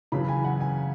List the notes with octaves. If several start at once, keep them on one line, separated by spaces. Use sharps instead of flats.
F#2 C#3 E3 B5
G#5
F#5
G#5